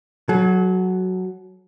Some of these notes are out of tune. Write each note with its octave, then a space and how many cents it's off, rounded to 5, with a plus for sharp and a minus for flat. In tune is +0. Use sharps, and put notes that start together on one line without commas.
F#3 +0 A4 -40